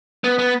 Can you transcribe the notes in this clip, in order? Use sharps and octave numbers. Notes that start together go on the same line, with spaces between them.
B3
B3